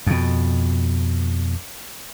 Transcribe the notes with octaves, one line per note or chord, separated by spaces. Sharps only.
F2 B2